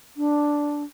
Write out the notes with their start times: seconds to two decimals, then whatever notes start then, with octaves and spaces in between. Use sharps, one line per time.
0.17 D4